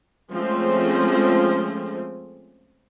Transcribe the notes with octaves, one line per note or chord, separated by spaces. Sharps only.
F3 G#3 A3 C4 C#4